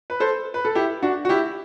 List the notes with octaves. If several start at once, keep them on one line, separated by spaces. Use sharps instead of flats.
B4
A4 C5
B4
A4
E4 G4
D4 F#4
F#4
E4 G4